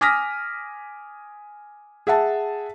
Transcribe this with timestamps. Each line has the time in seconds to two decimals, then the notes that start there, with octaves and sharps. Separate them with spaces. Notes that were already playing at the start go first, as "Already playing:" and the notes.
0.01 G#5 D6 D#6 F6 A#6 B6
2.07 G#4 E5 F#5 A5